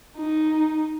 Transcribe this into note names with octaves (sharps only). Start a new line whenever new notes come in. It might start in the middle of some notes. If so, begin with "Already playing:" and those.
D#4